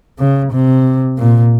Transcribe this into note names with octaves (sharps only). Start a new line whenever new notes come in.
C#3
C3
A#2